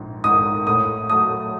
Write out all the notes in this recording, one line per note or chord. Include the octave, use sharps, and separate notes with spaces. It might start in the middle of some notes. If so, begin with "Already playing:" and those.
Already playing: A#1 G#2
G#2 D#3 D#6
A2 D#6
F#3 A3 D#6